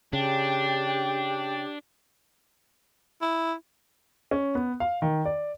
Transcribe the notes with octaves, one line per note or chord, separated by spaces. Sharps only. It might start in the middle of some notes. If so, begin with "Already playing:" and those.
C#3 D4 G4 G5
E4
C#4
B3
F5
D#3
D5